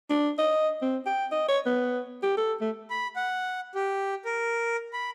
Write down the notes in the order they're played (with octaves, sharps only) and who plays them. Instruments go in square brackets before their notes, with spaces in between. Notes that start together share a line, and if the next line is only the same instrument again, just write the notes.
[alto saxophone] D4
D#5
C4
G5
D#5
C#5
B3
G4
A4
A3
[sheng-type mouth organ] B5
F#5
G4
A#4
B5